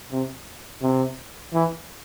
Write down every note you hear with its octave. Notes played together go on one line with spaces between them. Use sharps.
C3
C3
E3